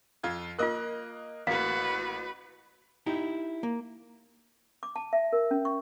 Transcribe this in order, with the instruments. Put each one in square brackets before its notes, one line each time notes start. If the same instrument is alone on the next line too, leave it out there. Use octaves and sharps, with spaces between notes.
[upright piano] F2 F4 G#6
[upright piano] A#3 D#5 F#6 [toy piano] F4 A#4
[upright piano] A1 A#3 [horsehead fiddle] F#4 B4 [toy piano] F5
[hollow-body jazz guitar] D#4 E4 G4
A#3
[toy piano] D6
A5
E5
A#4
C#4
C#6